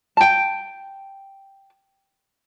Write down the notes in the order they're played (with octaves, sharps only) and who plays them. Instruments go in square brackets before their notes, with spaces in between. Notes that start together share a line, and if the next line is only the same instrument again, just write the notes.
[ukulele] G5 A5